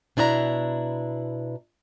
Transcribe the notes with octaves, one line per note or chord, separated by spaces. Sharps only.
B2 D4 E4 D5 A#5